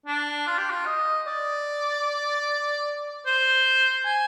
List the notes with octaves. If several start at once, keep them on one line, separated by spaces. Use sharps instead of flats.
D4
F4
G4
F4
D#5
D5
C5
G#5